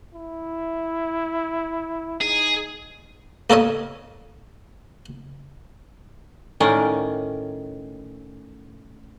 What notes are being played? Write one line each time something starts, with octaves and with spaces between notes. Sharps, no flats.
E4
D#4 G#4
A#3 A4 A#4 C#5 D#5
A2 D#3 C#4 A#4 D5 D#5